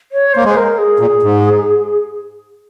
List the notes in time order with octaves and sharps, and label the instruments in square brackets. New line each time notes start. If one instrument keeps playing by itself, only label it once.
[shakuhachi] C#5
[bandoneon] A#3 [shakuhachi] C5
[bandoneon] G#3 [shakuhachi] C5
[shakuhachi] A#4
G#4
[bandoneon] A#2
G#2